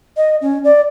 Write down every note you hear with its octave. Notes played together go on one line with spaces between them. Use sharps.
D#5
C#4
D5